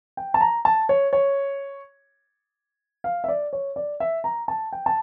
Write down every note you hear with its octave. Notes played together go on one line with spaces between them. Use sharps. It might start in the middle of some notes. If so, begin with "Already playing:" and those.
G5
A5
A#5
A5
C#5
C#5
F5
E5
D5
C#5
D5
E5
A#5
A5
G5
A5